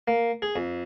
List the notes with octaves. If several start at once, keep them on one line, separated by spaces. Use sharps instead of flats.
A#3
G#4
F2